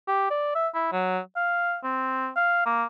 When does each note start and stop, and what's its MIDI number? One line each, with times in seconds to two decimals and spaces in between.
0.08 0.27 67
0.30 0.54 74
0.55 0.68 76
0.75 0.88 64
0.93 1.19 54
1.36 1.77 77
1.84 2.29 60
2.37 2.62 77
2.66 2.84 58